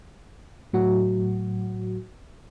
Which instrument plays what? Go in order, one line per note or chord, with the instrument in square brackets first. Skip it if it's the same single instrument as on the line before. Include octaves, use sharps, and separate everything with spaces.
[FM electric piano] A2 F#3 F#4